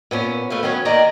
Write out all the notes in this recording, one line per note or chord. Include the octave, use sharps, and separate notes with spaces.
A#2 B3 C#4
D2 A3 B4 F5
D#3 F#3 B3 C#4 C#5
D#2 D#3 A#4 D5 D#5 A#5